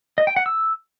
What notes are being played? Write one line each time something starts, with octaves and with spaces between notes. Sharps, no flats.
D#5
G5
F#5
E6